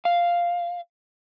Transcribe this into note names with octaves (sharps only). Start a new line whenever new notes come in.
F5